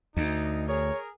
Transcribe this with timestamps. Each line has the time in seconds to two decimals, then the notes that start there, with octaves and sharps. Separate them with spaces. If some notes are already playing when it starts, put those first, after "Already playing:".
0.17 D2 D#4
0.69 G#4 A#4 C#5